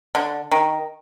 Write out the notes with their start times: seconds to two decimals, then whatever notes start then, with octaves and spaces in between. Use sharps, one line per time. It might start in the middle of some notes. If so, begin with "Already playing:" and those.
0.15 D3
0.51 D#3